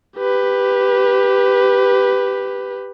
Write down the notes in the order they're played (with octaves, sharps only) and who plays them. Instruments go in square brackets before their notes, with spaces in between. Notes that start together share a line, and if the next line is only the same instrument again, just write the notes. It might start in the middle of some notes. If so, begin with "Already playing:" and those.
[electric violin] G4 B4